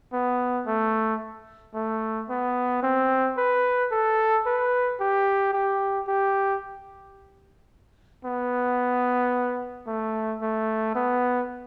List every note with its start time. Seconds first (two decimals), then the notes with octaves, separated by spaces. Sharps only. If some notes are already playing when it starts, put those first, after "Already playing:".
0.13 B3
0.67 A3
1.74 A3
2.30 B3
2.83 C4
3.38 B4
3.92 A4
4.46 B4
5.00 G4
5.54 G4
6.08 G4
8.25 B3
9.87 A3
10.42 A3
10.95 B3